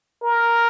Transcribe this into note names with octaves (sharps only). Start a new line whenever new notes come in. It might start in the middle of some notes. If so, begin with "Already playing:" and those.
A#4